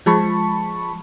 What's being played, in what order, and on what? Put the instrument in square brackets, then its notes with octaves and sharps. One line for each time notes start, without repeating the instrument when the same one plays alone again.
[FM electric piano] F3 G#3 A5 B5 C#6